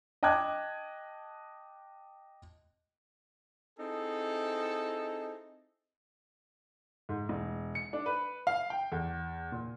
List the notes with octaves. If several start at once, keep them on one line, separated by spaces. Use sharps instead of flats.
D#5 G5 A5 D6 F#6 G#6
C4 D#4 E4 G#4 A4
G#2
E1
C#7
D4
B4
F5
G5
E2
A#2